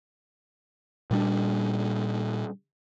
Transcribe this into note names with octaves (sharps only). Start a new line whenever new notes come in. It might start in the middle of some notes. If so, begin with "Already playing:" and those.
A#2 G3 D4